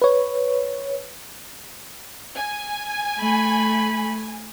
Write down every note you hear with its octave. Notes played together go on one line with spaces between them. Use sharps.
B4 C#5
G#5
A3 B5